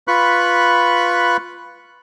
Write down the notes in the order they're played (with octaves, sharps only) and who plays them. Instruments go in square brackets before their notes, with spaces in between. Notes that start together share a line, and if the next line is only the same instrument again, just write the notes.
[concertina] F4 B4 B5 C#6 F#6